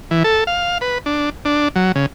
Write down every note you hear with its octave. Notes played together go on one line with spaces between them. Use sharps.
E3
A4
F5
B4
D4
D4
F#3
C#3